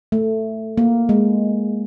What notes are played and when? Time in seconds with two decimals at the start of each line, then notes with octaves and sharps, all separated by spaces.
0.12 A3
0.78 A#3
1.09 G#3